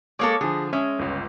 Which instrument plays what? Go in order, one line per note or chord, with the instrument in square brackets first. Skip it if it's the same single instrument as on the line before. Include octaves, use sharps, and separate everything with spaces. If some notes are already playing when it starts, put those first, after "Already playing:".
[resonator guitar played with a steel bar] G#3 A#3 A4 [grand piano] C#5 D6
[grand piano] D3 F3 [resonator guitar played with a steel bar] G#4
[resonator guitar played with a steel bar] G#3 [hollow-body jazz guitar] C#4 [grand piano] E5
[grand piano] G1 C#2